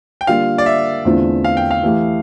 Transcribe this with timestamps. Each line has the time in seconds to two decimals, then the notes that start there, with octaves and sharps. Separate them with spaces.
0.21 G5
0.27 D3 G3 A#3 F4 F5
0.58 D5
0.66 E5
1.05 E2 D3 A3 C4 F4
1.44 F5
1.57 G5
1.71 F5
1.83 E3 A3 E4 G4